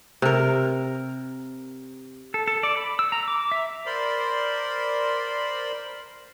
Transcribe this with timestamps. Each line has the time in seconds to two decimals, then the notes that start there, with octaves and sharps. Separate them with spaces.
0.22 C3 A#4
2.34 A4
2.47 A4
2.63 D5
2.77 B5
2.99 E6
3.12 A#5
3.28 D6
3.52 E5
3.86 A#4 C5 D5 B5 C6